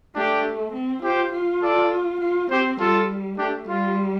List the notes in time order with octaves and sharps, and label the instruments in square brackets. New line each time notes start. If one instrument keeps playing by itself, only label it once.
[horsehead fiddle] A3 [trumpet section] D4 G4
[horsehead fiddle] C4
[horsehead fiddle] F4 [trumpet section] G4 C5
[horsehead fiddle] F4
[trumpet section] A4 D5
[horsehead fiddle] F4
[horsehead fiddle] C4 [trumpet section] G4 C5
[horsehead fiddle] G3 [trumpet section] F4 A4
[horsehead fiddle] A3 [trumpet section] D4 G4
[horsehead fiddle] G3 [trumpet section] F4